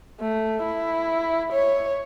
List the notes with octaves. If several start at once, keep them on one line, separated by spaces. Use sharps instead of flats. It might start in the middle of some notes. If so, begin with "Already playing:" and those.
A3
E4
C#5